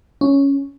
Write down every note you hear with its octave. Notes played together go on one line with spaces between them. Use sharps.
C#4